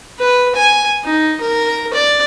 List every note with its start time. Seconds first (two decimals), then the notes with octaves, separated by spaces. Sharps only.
0.20 B4
0.56 G#5
1.04 D#4
1.40 A#4
1.93 D5